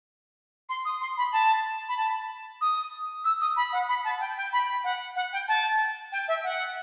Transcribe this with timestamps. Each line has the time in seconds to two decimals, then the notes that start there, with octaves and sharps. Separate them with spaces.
0.69 C6
0.85 D#6
1.01 C6
1.17 B5
1.32 A5
1.88 B5
1.97 A5
2.61 D#6
3.24 E6
3.41 D#6
3.56 B5
3.72 F#5
3.88 B5
4.04 A5
4.20 G5
4.37 G5
4.52 B5
4.84 F#5
5.16 F#5
5.33 G5
5.48 A5
6.12 G5
6.28 E5
6.43 F#5